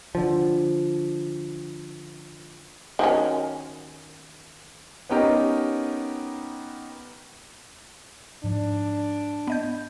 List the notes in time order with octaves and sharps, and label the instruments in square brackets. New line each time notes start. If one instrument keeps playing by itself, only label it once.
[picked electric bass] D3 F3
[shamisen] D#3 F#3 C#4
[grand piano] B3 C#4 D#4 G4 A#4 B4
[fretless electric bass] G#2 F3 [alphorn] D4
[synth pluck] B3 D#5 G6